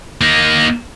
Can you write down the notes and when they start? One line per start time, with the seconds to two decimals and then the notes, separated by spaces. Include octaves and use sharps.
0.21 A#3 D#4